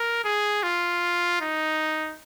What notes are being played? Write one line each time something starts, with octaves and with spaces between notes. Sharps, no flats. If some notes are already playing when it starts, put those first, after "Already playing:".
Already playing: A#4
G#4
F4
D#4